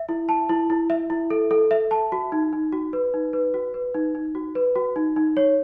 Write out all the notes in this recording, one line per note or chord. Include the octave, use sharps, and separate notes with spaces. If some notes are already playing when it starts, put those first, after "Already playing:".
Already playing: E5
E4
A5
E4
E4
E5
E4
A4
A4
E5
A5
F#4
D#4
D#4
F#4
B4
D#4
B4
F#4
B4
D#4
D#4
F#4
B4
F#4
D#4
D#4
C#5